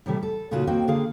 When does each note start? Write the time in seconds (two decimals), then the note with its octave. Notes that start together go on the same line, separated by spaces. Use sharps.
0.06 A2 C3 E3 G3 A3
0.23 A4
0.51 A#2 C#3 D#4 F4 F#4 A4
0.67 A#3 C4 F#4 C5 D#5 G5
0.88 D3 A#3 G#4 F5